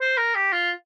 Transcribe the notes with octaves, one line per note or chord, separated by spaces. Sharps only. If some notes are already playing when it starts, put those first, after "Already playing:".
C5
A#4
G4
F4